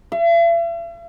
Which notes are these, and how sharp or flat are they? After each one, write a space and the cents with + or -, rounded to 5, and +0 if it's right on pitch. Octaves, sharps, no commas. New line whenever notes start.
E5 +45